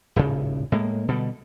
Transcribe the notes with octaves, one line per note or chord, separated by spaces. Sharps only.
D#1 G#1 A2 C#3
A2 G#3 A#3
B2 D3 G3